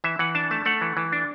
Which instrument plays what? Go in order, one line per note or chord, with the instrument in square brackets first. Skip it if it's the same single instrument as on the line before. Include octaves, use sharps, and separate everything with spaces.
[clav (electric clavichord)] E3 E5
E3 F#5
D4 A5
A3 A5
A3 F#5
E3
E3
D4